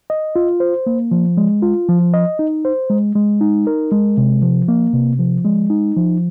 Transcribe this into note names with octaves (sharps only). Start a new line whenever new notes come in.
D#5
F4
C5
A#3
F3
G#3
F4
F3
D#5
D#4
C5
G#3
G#3
D#4
A#4
G#3
C3
F3
A#3
C3
F3
G#3
D#4
F3